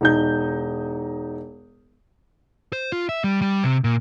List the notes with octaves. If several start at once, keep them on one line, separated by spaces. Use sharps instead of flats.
E1 D#4 G6
C5
F4
E5
G3
G3
C3
A#2